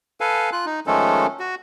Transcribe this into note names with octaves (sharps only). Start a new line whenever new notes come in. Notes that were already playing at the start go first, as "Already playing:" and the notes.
A4 B4 F5 G#5
F4 F#6
D#4
D#3 F3 G#3 A3 C#4 A4
F#4